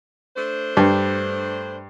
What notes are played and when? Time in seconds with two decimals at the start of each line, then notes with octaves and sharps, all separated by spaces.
0.37 A3 D4 C5
0.77 G2